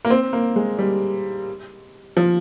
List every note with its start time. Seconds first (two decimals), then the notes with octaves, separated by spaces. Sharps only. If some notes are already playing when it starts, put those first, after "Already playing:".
0.05 A#3
0.10 C4
0.33 A#3
0.56 G#3
0.78 G3
2.17 F3